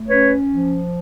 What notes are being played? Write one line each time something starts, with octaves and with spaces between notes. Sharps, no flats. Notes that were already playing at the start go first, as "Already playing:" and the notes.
Already playing: A3
C#4 B4 C#5
F3